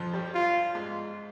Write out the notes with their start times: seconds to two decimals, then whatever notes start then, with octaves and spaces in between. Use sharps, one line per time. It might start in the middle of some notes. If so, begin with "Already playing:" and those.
Already playing: F2 F3
0.14 G2 G3
0.34 F4
0.75 G#2 G#3